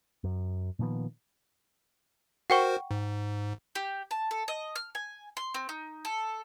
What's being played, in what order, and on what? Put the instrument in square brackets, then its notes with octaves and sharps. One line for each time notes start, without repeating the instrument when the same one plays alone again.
[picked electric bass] F#2
A#2 D#3 F3 B3
[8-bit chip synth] F#4 A#4 C5 [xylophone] F#5 G5 C#6
[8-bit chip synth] G#2
[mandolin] G4
A5
A4
D#5
F6
G#5
C6
C4
D#4
A4